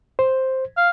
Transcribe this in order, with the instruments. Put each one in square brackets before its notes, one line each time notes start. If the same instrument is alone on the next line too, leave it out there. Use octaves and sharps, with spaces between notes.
[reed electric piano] C5
[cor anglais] F5